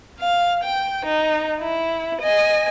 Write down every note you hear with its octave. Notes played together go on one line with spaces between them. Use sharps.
F5
G5
D#4
E4
D#5 G#5